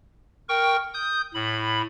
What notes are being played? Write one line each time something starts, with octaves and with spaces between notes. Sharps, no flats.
A#4 G5 C#6
D#6 G6
A2 B5